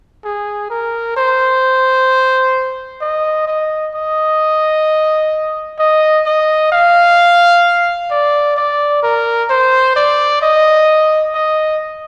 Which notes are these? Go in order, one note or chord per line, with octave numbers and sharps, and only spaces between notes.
G#4
A#4
C5
D#5
D#5
D#5
D#5
D#5
F5
D5
D5
A#4
C5
D5
D#5
D#5